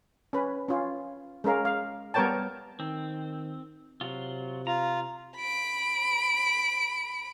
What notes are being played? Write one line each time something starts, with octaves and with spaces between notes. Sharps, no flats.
C#4 B4
C#4 F4
G#3 C#4 A#4 F5
F5
G3 B3 A#4 C#5 G5 A5
D#3 C4
C3 F#3 F4
F4 A#5
B5 D7